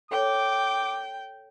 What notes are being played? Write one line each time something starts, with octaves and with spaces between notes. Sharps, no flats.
A4 C#5 G5 D6